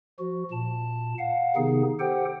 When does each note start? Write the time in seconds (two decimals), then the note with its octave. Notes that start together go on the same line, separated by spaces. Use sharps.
0.19 F3 F#4
0.51 A#2 A5
1.19 F5 F#5
1.56 C3 D#3 B3 D#4 G#4
2.00 G4 A4 C5 F#5 G5